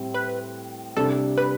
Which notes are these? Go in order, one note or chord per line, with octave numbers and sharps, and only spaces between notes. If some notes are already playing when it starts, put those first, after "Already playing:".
Already playing: A2 G3 C4
B4
C2 C3 G3 D4 A4
B4